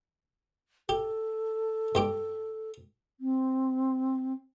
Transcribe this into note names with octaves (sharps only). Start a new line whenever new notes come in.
G4 A4
G2 G4 D6
C4